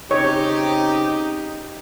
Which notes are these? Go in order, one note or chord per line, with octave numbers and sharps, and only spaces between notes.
C#3 C4 D#4 G4 C#5